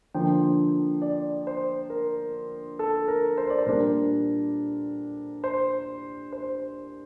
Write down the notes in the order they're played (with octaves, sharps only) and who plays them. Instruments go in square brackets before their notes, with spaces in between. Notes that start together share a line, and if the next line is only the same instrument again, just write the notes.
[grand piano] D3 F3 A#3 D4 G5
D5
C5
A#4
A4
A#4
C5
D5
C5
A#2 G3 D4 A#4
C5
C5